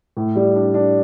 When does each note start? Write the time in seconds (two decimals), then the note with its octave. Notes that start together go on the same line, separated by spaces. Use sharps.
0.17 A2
0.35 G3
0.55 D4
0.74 D4